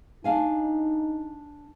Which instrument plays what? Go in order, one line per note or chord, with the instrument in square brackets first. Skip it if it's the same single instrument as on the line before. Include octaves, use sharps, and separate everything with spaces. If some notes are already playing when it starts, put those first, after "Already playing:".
[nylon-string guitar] D4 F5 G#5 [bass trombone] D#4